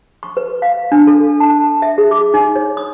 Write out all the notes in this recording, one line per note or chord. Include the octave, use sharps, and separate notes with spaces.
C#6
B4
F5
D4
A4
A5
E5
G#4
D6
D#4
C#5
D#6